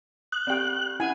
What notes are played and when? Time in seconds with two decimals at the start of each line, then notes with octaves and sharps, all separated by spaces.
0.32 D#6 F#6
0.47 C4 G4 D5 G5
1.00 C#4 E4 F#5 G#5